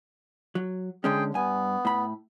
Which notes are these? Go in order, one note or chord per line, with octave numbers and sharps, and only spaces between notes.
F#3
D3 G#3 C#4 G#4 G5
G2 B3 G#5
A2 B5